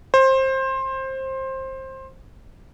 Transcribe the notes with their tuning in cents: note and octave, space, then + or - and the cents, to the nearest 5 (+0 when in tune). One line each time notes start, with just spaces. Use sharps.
C5 +20